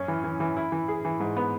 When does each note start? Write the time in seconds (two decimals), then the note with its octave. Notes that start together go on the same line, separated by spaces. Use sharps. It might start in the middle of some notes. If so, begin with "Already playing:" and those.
Already playing: F#2 C#4
0.08 E3
0.24 E3
0.40 E3
0.56 E4
0.72 E3
0.88 G#4
1.05 E3
1.20 G#2
1.37 B3